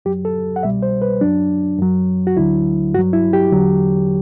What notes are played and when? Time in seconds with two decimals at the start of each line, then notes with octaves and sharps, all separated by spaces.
0.05 F#2 F#3 G4
0.25 A4
0.56 F#5
0.63 C2 B2 G3 E5
0.82 C5
1.02 B4
1.21 F#2 F#3 D4
1.79 F#2 F#3
2.27 F#4
2.36 D2 D3 F#3 E4
2.94 G2 F#3 F#4
3.13 E4
3.33 G4
3.52 E2 D3 F#3